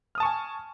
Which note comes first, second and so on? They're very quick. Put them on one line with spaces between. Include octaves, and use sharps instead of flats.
F6 D#6 A5 C#6 G#5